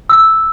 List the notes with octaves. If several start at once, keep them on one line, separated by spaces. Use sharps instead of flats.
E6